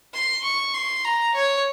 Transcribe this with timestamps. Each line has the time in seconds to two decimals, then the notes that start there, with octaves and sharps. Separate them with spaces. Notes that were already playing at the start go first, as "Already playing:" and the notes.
0.14 C6
0.44 C#6
0.74 C6
1.05 A#5
1.35 C#5